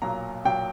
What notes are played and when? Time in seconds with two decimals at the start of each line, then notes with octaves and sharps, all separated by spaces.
0.02 B1 A#2 F#3 A#5
0.45 B1 A#2 F#3 G5